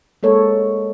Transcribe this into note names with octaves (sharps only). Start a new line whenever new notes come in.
G#3 A#3 A4 C#5